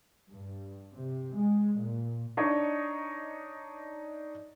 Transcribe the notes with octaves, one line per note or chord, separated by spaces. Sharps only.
G2
C3
G#3
A#2
D4 D#4 C#5 D#5